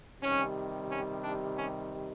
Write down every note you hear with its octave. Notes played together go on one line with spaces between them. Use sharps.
C3 D#3 G3 C#4
C#4
D4
C#4